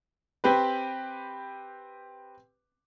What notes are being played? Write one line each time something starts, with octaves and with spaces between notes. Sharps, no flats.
C4 G4 B4